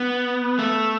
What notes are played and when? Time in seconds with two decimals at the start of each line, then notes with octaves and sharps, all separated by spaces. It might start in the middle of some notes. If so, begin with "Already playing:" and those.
Already playing: B3
0.59 A3